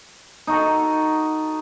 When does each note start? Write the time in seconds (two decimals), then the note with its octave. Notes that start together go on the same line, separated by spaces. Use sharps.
0.47 D#4 F#4 A4